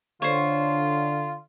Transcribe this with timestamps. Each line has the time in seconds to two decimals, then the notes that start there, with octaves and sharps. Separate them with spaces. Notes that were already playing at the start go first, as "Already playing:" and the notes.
0.22 D3 F4 C5 C#5